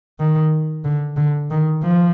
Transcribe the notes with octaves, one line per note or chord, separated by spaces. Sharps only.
D#3
D3
D3
D#3
F3